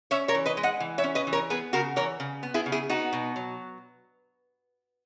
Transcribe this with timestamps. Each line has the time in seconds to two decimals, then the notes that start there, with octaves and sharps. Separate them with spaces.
0.11 C#4 C#5 E5
0.28 A#4 C#5
0.35 E3
0.46 B4 D#5
0.57 G#3
0.63 D#5 F#5
0.80 E3
0.98 C#5 E5
1.04 C#4
1.15 B4 D#5
1.27 E3
1.33 A#4 C#5
1.50 B3 G#4 B4
1.73 C#3 F#4 A#4
1.96 E3 A#4 C#5
2.20 C#3
2.43 B3
2.54 E4 G#4
2.66 C#3
2.72 E4 G#4
2.90 B3 D#4 F#4
3.13 B2
3.36 F#3